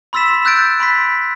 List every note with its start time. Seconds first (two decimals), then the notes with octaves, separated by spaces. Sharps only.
0.13 B5 C6 E6 A6 B6 E7
0.45 E6 F#6 G6 A6 D7
0.80 B5 C6 B6